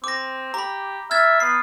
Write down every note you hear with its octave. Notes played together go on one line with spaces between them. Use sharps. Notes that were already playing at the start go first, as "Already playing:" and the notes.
C4 D6 A#6
G4 A#5 B5
E5 F6 G#6 A6
B3 C7